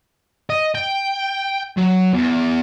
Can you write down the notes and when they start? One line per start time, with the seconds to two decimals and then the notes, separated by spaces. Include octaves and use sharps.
0.50 D#5
0.75 G5
1.77 F#3
2.13 E2